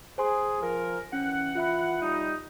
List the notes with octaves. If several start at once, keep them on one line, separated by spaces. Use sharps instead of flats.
G#4 C5 G#5 C6
F3 A#4
E3 C#4 F#5
F4 E5 B5
G3 D#4